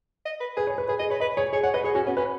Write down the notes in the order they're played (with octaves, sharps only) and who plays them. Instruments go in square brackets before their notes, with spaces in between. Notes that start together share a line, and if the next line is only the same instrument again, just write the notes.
[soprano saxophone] D#5
B4
[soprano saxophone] G#4 [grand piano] B4
[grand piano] C#5
B4
[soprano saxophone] G#4 [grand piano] B4
[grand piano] G#4 [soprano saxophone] D#5
[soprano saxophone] B4 [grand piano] C#5
[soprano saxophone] B4 [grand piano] D#5
[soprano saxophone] G#4 [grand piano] C#5
[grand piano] G#4 [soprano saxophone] C#5
[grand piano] C#5 [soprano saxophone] F#5
[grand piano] B4 [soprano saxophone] D#5
[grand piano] G#4 [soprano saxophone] C#5
[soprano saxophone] C#4 [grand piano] F#4
[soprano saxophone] B3 [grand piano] C#4
[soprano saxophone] C#4 [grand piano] B4